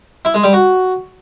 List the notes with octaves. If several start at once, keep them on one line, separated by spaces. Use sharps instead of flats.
E4
G#3
G3
F#4